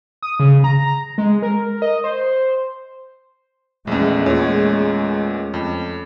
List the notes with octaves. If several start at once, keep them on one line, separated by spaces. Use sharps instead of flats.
D#6
C#3
A#5
G#3
A#4
D#5
C5
A#1 E2 G#3 A3 C#4
E2 A#2 F4 C#5
F2